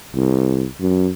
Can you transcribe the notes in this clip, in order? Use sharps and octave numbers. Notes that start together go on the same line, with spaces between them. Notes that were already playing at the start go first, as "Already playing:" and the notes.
C2
F#2